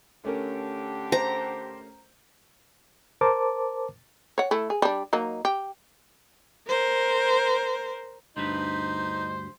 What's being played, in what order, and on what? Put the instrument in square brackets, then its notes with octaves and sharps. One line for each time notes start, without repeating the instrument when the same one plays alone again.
[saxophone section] D3 G4 [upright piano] A3 C#4 A#4
[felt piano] C5 [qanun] A#5
[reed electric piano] A#4 C5 A5 D6
[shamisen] C#5 F#5
A3 E4
G#4
G3 D4
F#3 A#3 D#4
G4
[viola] A#4 C5
[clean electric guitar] D2 G2 B4 [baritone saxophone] D#4 [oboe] C5